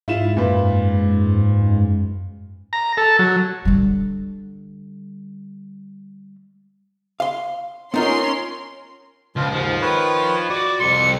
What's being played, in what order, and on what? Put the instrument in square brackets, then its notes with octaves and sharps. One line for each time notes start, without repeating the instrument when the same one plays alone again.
[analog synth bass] G#2 [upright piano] E4 F4 E7
[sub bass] F#2 [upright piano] A#2 B4
[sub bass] F#2
[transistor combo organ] A#5
A4
F#3
[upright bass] D3 G3
[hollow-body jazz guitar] F5 C6
[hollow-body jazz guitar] B3 D#4 F4 [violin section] C#4 A#4 C6
[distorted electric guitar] C#2 [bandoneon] F3 F4
[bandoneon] D#2 G#2 [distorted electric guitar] F3
[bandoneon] D#3 B4 C#5
[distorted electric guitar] F#4 [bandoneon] D5 [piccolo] D6
[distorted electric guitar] C2 C6 [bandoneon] F2 [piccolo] C#7